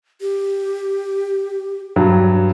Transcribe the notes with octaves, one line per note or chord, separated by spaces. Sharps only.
G4
G2 F#3